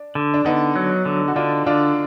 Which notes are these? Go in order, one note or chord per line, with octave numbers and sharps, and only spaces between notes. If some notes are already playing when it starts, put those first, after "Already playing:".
Already playing: D4
D3
D4
D3 B3 D#4
F#3
D3
F#4
D3 D4 F4
D3 D4 F4